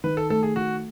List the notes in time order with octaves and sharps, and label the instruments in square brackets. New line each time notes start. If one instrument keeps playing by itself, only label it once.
[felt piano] D#3 [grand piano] B4
[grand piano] A4
[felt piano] A3 [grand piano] A4
[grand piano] G#4
[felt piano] D#3 [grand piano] F#4